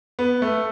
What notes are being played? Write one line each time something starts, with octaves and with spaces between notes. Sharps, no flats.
B3
A3